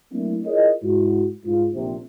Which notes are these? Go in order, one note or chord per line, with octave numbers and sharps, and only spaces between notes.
F#3 A3 A#3 C4 D4 E4
E4 F4 G#4 A#4 C#5 D#5
G#2 E4 F#4
G#2 F4
A#1 C3